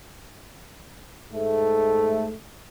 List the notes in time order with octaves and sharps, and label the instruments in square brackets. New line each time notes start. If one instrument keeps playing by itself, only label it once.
[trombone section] G#2 A3